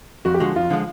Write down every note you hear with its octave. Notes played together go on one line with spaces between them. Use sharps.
F2 F#4
G4
D3 F3 G#3 F#4
F2 F4
D3 F3 G#3